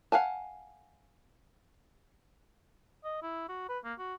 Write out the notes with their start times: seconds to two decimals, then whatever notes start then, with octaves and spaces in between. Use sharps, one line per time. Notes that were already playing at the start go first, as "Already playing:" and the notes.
0.12 F5 F#5 G#5 A5
3.05 D#5
3.23 E4
3.49 F#4
3.69 B4
3.84 A#3
3.99 F#4